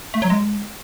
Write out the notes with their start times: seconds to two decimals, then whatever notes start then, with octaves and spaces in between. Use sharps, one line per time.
0.14 A3
0.22 F#3
0.30 G#3